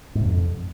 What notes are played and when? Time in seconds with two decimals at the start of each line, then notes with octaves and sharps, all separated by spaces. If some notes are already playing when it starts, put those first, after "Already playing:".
0.15 G#2
0.20 C3
0.25 F2